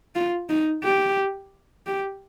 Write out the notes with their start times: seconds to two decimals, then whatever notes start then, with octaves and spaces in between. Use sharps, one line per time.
0.15 F4
0.49 D#4
0.84 G4
1.87 G4